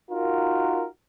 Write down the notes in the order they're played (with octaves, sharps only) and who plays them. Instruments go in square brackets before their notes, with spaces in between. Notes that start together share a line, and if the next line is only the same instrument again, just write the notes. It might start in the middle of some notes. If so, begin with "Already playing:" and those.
[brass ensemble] D#4 F4 F#4 A#4